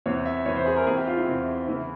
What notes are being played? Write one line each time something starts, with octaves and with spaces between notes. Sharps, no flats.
E2 C3 E3 C#5
E5
E2 C3 E3 C#5
C5
G#4
A#4
E2 C3 E3 G#4
G4
F4
E4
E2 C3 E3
E2 C#3 E3 E4